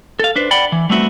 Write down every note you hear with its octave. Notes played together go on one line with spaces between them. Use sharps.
A4 F5
D4 B4 C5
D5 F#5 G5 B5
E3
G3 A3 B3 C4 E4 F#4